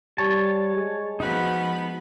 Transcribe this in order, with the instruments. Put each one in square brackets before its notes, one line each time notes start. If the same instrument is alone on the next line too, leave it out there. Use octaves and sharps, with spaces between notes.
[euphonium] G3 [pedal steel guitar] C#5 A5
[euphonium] G#3
[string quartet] F3 B3 B5 [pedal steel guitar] D#4 F#4